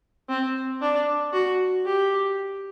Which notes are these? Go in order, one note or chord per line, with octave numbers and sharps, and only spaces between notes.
C4
D4
F#4
G4